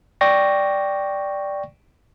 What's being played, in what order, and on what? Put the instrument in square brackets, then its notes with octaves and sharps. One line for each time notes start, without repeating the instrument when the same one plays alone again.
[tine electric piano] D5 G5 C#6 A#6